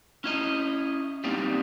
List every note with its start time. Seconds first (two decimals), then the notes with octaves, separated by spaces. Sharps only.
0.24 C#4 E4 D#5
1.24 G3 A#3 C4 D#4 D5